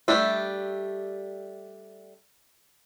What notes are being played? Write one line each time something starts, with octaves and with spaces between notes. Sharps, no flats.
G3 A3 D4 G4 E5